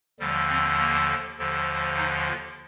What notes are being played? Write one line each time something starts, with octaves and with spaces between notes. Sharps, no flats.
D#2 D3 F3 G3
C4
A#3
D#2 D3 F3
D#4
F4